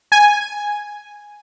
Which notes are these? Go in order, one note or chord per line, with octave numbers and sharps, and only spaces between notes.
G#5